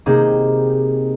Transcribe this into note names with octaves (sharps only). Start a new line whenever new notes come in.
C3 A#3 D#4 G4 G#4